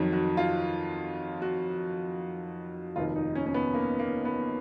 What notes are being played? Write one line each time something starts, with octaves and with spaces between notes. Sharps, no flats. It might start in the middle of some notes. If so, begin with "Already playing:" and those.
Already playing: F2 D#3 F#3
F#4
F4
F#4
F1 D#2 D#3 F4
D#4
C#4
C#4
B3
A#3
A#3
B3